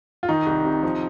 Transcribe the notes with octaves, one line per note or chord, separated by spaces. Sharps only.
F4
D#3 D#4
C2
C3
F3